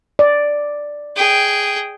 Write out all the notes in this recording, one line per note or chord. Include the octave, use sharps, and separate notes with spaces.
D5
G#4 G5